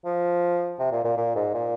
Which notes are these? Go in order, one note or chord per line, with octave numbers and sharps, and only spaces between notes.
F3
C3
A#2
A#2
A#2
G#2
A#2